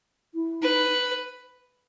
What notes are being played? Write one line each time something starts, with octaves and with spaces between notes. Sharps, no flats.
E4
D#4 B4